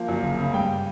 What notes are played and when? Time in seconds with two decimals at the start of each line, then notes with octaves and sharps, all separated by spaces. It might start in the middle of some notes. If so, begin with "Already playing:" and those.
Already playing: F3 A#3
0.08 F#2
0.23 F#1
0.38 C#3
0.53 G2 G5